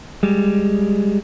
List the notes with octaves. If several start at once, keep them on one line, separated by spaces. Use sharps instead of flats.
G3 G#3